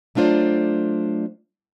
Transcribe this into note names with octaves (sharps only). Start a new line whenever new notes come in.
F#3 A3 D4 F4 C5 D5